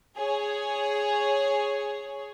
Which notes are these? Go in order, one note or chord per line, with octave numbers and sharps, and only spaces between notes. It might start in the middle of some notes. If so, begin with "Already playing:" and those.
G#4 C#5